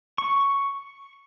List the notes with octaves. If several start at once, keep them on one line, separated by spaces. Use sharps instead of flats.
C#6